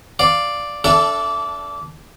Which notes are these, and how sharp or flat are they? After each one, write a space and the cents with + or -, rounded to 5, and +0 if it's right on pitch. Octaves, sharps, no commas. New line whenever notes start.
D5 +0 F5 +0
D4 -20 A4 +0 E5 +25